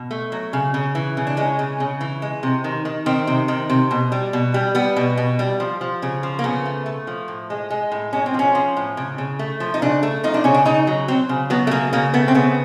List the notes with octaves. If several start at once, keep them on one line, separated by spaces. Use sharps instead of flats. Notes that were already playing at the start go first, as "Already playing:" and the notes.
Already playing: B2
A3
F#3
C#3
C#3
E3
C#3
D4
G#3 C#4
C#3
C#3
E3
G#3
C3
D#3
D#3
D#3 C4
C3
D#3
C3
B2
G3
B2
G3
G3 B3
B2
B2
G3
F3
F3
C#3
F3
A#3
C#3 B3
A3
A3
F3
A2
G#3
G#3
A2
G#3 C#4
C4
F3 C#4
F3
A2
C#3
C#3
A3
F3
D#4
C#3 D4
A3
F3 D#4
D4
C#3 C#4
D4
C#3 D#4
F#3
F#3 C4
C#3
F#3 B3
A3
C#3 A#3
C#3 A#3
A3 B3
C4
C#3 B3